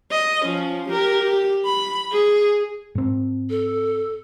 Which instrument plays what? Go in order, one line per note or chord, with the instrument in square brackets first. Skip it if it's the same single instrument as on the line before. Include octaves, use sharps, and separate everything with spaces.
[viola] D#5
F3 C#4
G4 A#4
G4
B5
G#4
[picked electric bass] G#2 C4
[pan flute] A4